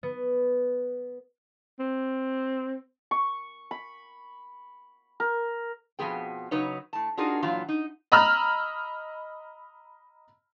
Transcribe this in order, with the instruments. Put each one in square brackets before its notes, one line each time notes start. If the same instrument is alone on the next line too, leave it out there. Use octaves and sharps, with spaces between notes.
[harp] B3
[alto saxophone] C4
[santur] C#6
B5
A#4
[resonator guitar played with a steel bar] F2 B2 F3 B3 G#4 G5
C#3 F#3 D#4 B4 C#5
A2 A5
D4 D#4 F4 F#4 G#4 A#4
A#2 E3 F#3 F4
D#4
[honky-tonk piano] D#5 A#5 B5 E6 F6